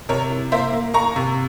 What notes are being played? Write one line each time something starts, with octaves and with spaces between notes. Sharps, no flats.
C3 A#4 C#5
E4
A#3 C5 E5
A#3
A#3 A#5 C#6
C3